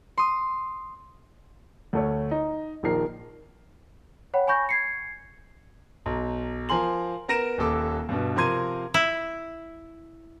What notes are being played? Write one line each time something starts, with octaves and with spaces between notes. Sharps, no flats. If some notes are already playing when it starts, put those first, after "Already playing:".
C6 D#6
D2 A3 C#5
D#4
A#1 D#3 F3 A#4 C7
C#5 F#5 G5 B5
G#5 B5 C#6 G6 A#6
G#6 C7 C#7
B1
F3 A#4 G#5 C6 F#7
B3 A#4 A#6 D7 E7
D#1 D#2 A4 D6
G2 B2
C3 F3 A#4 C6 G#6 D#7
E4